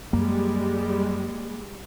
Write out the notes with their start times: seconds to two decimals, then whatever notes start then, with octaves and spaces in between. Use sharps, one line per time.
0.13 F#2 G3 G#3 A#3